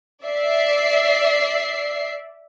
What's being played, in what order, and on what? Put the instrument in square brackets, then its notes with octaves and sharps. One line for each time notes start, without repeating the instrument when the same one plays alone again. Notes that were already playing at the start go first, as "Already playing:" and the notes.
[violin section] D5 E5 C7